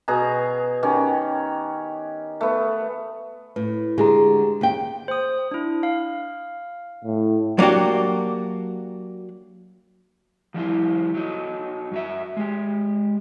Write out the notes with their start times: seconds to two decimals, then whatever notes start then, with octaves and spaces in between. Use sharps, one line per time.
0.08 B2 G#4 A#5
0.83 D#3 C#4 G4
2.41 A3 B3
3.56 A2 B4
3.98 D3 G#3 G4 G#4 A#5
4.61 D#2 G5
5.08 C5 D#6
5.51 D4 E4
5.83 F5
7.04 A2
7.59 F#3 A#3 D4 F#4 G4
10.54 F3 G3 E4 F4
11.15 F#3 D#4
11.92 F#2 F#3 E5
12.37 G#3 G4